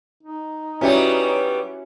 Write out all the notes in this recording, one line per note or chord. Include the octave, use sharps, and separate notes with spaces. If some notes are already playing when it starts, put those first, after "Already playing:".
D#4
F#3 G3 B3 C#4 E4 F#4